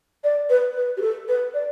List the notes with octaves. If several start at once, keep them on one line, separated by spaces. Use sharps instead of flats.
D5
B4
B4
G4
A4
B4
D5